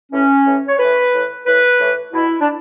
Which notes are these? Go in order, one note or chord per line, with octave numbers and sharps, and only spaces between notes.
A2 E3 C#4
A2 E3
C#5
A2 E3 B4
A2 E3
A2 E3 B4
A2 E3
B2 E4
D4